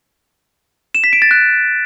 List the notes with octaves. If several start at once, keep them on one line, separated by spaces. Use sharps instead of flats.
E7
B6
D7
A6
F#6